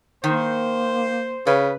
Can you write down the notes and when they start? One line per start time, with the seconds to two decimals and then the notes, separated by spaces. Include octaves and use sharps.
0.24 D#3 A#3 C5
1.47 C#3 B4